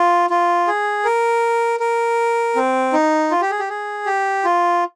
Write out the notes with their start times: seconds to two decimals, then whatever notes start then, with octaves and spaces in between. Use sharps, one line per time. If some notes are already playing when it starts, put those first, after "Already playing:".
Already playing: F4
0.30 F4
0.67 G#4
1.05 A#4
1.80 A#4
2.56 C4
2.93 D#4
3.31 F4
3.41 G4
3.51 G#4
3.59 G4
3.69 G#4
4.06 G4
4.45 F4